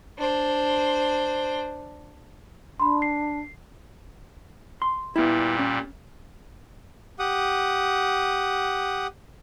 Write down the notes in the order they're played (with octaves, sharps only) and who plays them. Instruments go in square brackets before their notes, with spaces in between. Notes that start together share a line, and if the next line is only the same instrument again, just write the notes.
[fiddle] D4 C5
[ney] D4 [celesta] B5 C6
[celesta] C7
[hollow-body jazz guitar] C6
[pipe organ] A#2 G3 [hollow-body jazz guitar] B3 E4
[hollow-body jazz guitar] C#4
[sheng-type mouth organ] G4 F#5 D#6